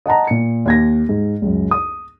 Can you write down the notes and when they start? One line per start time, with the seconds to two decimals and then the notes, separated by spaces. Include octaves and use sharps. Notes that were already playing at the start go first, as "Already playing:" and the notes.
0.06 D#5 F#5 A5 A#5
0.27 A#2 C#7
0.66 D#2 G#6 A#6
1.09 G#2
1.42 C#2 F#2
1.71 D#6